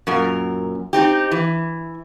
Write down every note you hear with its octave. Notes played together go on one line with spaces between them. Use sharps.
F#2 A#2 A#4
C4 D#4 G4
E3